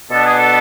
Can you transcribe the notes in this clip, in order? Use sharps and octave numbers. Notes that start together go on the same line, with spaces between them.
B2 B3 D4 A4
G#4
A4